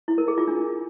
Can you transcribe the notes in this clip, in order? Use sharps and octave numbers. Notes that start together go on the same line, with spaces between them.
E4
A#4
G#4
F4
D4